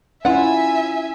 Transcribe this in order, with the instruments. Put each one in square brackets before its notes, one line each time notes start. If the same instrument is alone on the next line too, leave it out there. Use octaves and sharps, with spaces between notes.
[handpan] C#4 E4 [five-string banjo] F4 F#5 [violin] E5 G#5